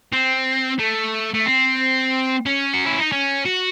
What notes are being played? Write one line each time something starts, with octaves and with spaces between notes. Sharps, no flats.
C4
A3
A3
C4
C#4
F#4
E4
D#4
C#4
F#4